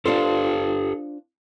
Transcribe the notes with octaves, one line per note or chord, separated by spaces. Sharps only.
D4 F4 G4 A4 C5